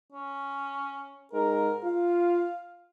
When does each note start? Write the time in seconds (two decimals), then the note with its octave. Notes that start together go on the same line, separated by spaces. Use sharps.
0.12 C#4
1.33 G#2 A#4
1.84 F4 F5